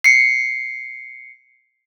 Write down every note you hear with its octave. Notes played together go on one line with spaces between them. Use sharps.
C7 C#7